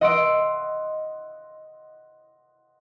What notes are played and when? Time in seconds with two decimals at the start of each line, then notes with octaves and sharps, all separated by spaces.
0.01 D#5 F#5 C6 D#6 E6 D7